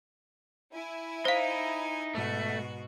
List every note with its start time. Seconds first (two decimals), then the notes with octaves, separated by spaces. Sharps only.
0.73 E4 G#5
1.25 D#4 C5 F5
2.15 G#2 B2 A3 F#4